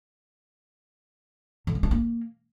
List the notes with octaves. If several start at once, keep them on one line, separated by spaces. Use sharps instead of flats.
D3
G#3
D4
A#3